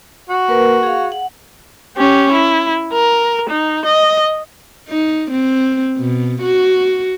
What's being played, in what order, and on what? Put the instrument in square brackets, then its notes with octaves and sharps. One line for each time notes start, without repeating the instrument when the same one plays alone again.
[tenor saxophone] F#4
[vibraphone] A#3 A#4 B4
G#4 F5
F#5
[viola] C#4 G4
E4
A#4
D#4
D#5
[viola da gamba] D#4
C4
B2
F#4